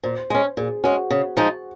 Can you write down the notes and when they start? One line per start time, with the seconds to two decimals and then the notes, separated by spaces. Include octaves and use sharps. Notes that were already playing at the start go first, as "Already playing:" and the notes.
0.03 A#2 C5
0.30 G#3 C#4
0.57 A#2 G#4
0.84 G#3 C#4 F#4
1.10 C#3
1.37 F3 G#3 D#4